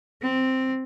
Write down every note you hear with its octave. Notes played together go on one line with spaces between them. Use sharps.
C4